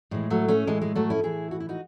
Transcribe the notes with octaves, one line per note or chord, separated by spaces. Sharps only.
A2 E3 G#3
F#3 A3
A3 C#4
A2 E3 G#3
G#3
F#3 A3
C#4 E4
A2 E3 E4 G#4
F#4
E4
D#4 F#4